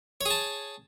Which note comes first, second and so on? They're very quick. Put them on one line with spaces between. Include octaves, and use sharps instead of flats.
C#5 G#4 A5